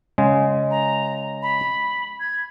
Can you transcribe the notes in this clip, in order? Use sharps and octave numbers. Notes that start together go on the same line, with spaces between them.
C#3 G#3
A#5
B5
G#6